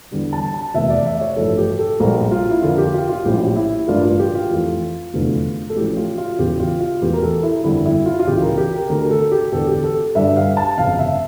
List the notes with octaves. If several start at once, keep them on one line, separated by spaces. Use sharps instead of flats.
E2 D3 G3 D4
A5
A5
F1 E2 E3 A#3 E5
D5
E5
C#5
A1 G2 F3 A3 A4
G4
A4
A#1 A#2 G3 A#3 A#4
F4
E4
F2 D3 F3 A#3 F4
G4
F4
F4
A#1 A2 F3 C#4 G4
E4
A1 G2 E3 A#3 D4 F4
F4
G4
F4
F2 E3 A3
F1 E2 D3 A3 D4
A4
A1 A2 F3 C#4 G4
F4
F4
E1 E2 C#3 E3 G4
F4
F4
E1 E2 E3 A3 G4
A#4
A4
E4
G1 F2 D3 G3 E4
E4
F4
F4
C#2 C#3 E3 G4
A#4
G4
A#4
D2 D3 A3 A#4
A4
G4
E1 E2 D3 A4
G4
A4
G2 D3 G3 D4 E5
F5
A5
G1 F2 C#3 F5
E5